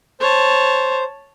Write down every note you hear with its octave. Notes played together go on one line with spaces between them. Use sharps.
C5 C#5 A5